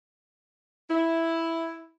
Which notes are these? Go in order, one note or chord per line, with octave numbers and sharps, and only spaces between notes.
E4